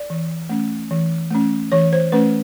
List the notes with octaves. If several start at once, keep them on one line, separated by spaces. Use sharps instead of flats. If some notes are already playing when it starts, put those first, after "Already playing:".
Already playing: D5
E3
A3 C#4
E3
A3 C#4
E3 C#5
C5
A3 C#4 B4